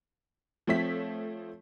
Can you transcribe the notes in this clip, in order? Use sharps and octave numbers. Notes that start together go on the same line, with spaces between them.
F3 A3 C4 C#5 E5 B6